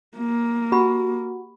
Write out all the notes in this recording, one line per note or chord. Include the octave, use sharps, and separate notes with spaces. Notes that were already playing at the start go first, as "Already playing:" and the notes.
A#3
F#4 G4 B5